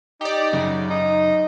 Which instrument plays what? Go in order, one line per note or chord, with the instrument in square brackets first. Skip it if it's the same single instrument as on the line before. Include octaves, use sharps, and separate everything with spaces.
[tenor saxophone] D#4 [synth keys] G4 D5
[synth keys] F#2 C#3
[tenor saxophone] D#4